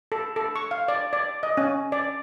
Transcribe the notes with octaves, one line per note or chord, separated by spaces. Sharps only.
A4
A4
C#6
F5
D5
D5
D#5
C#4
D5